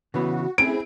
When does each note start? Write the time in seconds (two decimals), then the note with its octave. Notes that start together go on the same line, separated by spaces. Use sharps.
0.14 C#3 E3 B3 F#4
0.58 A3 C4 C#4 E4 G#4 D7